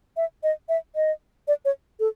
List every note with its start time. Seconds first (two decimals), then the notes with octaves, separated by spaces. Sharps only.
0.17 E5
0.43 D#5
0.69 E5
0.96 D#5
1.48 D5
1.65 C#5
2.00 A4